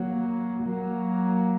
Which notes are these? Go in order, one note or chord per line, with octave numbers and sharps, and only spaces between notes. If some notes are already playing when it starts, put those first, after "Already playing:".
Already playing: F#3 A#3
F#3 A#3